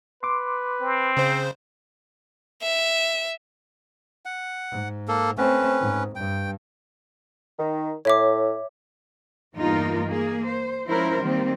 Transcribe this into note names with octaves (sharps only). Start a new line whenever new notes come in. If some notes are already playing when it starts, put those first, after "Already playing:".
B4 C6 D6
C4
C#3 C5
E5
F#5
G#2
A#3 A4
A3 C4 C#4 B4
G#2
G2 G5
D#3
A2 C#5 E5 D6
E2 G2 A#3 D#4 F4 A#4
A#3 G#4
C5
F3 G#3 C#4 E4 A#4 C5
D#3 G3 A#3 C4